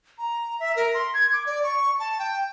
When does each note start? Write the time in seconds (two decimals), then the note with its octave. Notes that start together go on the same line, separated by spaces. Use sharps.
0.18 A#5
0.60 E5
0.76 A#4
0.94 C6
1.14 G#6
1.33 D6
1.46 D5
1.63 C#6
1.99 A5
2.19 G5